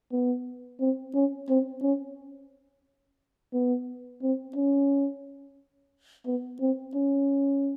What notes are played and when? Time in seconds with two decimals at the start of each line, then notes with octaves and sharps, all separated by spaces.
0.12 B3
0.81 C4
1.15 C#4
1.49 C4
1.83 C#4
3.54 B3
4.22 C4
4.56 C#4
6.26 B3
6.61 C4
6.95 C#4